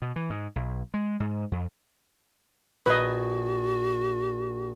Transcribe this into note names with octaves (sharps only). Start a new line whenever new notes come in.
B2
E3
G#2
B1
G#3
G#2
F2
A#1 F#4 B4 D#5 G#6